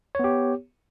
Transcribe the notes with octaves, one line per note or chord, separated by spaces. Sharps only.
B3 G4 C#5